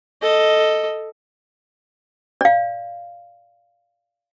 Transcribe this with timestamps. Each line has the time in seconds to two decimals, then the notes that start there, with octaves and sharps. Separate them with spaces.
0.22 A4 D#5
2.41 D5 F5